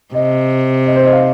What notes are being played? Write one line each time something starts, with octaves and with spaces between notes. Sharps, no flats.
C3 D#5
D#5
C5
D#5
F5